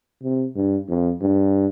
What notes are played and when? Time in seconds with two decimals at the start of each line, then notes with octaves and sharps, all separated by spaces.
0.23 C3
0.55 G2
0.88 F2
1.21 G2